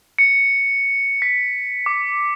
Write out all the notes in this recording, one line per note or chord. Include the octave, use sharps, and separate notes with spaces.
C#7
B6
D6